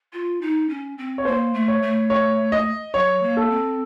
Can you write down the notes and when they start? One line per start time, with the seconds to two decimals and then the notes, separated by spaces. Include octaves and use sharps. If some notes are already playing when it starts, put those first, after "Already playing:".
0.13 F4
0.41 D#4
0.69 C#4
0.98 C4
1.18 C#5
1.25 A#3 C5
1.54 A3
1.68 C#5
1.82 A3
2.10 C#5
2.52 D#5
2.94 F#3 C#5
3.22 A#3
3.37 A4
3.50 C4